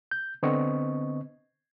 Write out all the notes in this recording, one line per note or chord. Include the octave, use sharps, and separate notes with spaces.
G6
D3 B3 C4 D#5 C#6